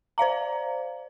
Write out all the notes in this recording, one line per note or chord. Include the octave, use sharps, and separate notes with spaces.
C5 D5 F5 A#5